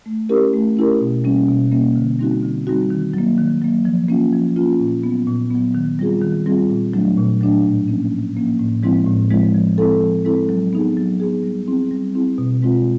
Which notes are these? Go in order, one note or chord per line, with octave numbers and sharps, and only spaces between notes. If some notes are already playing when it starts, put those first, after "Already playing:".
A3
C#4 E4 G4 A#4
A3
C#4 E4 G4 A#4
B2
G3 A#3 C#4
B2
G3 A#3 C#4
D3
G3 C4 D#4 F#4
D3
G3 C4 D#4 F#4
D#3
F#3 A#3
D#3
F#3 A#3
F3
A#3 C#4 F4
F3
A#3 C#4 F4
A#2
F#3 B3
A#2
F#3 B3
D#3
G3 C4 F4 G#4
D#3
G3 C4 F4 G#4
A#2
F#3 A3 D4
A#2
F#3 A3 D4
A2
F3 A#3 C#4
A2
F3 A#3 C#4
A2
F3 G#3 C4 E4
A2
F3 G#3 C4 E4
F3
G#3 C4 E4 A4
F3
G#3 C4 E4 A4
F#3
B3 D#4 G#4
F#3
B3 D#4 G#4
G3
C4 E4 G#4
G3
C4 E4 G#4
B2
G#3 C4 F4